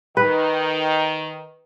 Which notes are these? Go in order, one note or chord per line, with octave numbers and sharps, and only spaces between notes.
D#3 B4